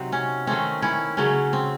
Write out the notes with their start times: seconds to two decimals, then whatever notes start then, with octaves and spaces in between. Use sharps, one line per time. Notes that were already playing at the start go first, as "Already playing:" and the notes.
Already playing: C3 F#3 C4 D#4
0.12 C#4
0.47 D#3 A3 C4 C#4
0.82 C#4 E4
1.17 C#3 F#3 A3 C#4
1.53 C4